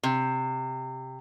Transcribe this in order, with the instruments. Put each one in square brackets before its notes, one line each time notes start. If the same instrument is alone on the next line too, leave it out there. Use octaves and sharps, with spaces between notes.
[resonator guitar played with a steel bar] C3